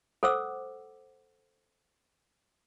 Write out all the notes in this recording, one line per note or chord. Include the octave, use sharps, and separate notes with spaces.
A4 C5 F#5 D6 E6